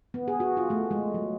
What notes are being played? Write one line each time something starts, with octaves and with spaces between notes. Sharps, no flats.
B3
G#4
F#4
F4
A3
G#3
F#3